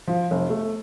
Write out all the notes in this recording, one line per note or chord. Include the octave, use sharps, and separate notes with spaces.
F3
F1
A3